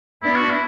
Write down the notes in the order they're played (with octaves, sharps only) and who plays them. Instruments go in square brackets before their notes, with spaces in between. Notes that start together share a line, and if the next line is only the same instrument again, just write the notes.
[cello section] B3 D4 [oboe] E4
[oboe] F#4
E4